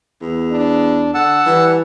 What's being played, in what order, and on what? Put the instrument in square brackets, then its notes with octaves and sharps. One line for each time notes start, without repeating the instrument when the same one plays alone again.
[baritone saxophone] E2
[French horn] D4
[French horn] D3 [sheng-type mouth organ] F#5 A5 E6
[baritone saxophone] E3 [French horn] G3